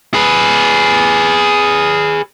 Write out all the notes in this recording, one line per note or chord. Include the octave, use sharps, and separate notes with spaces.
G#4 B4